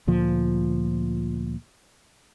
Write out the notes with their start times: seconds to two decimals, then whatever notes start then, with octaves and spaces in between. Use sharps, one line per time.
0.07 D2 A#2 F3